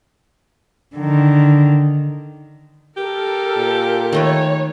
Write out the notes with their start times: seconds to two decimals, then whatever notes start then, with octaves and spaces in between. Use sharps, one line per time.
0.96 D3 D#3
2.97 G4 A4 A#4
3.57 A#2
4.13 D#3 A3 B4 C#5